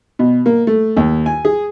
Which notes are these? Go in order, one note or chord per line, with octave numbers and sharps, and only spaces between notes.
B2
A#3
A3
D#2
G#5
G#4